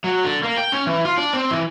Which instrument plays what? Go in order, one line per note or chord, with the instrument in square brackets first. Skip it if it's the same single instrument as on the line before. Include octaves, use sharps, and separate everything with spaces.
[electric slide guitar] F#3
D3
A#3
G5
C#4
E3
F4
D4
C4
E3